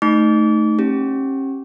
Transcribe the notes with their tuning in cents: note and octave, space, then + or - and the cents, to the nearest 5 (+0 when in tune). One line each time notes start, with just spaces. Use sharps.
A3 +0 D#4 +0 D6 -35
C#4 -45 G4 +0